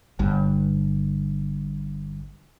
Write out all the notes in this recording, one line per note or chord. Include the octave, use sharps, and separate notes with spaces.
G1 G2